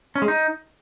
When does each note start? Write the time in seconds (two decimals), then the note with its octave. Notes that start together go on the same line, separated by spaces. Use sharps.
0.15 C#4
0.22 G#3
0.28 D#4